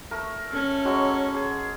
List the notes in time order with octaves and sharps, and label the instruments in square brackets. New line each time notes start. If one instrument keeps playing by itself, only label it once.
[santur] A3 A#4
[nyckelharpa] C#4 A4
[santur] F#3 G#3 F#4
G#4